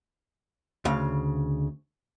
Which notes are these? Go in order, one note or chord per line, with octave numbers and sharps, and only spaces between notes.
D2 C#3 F5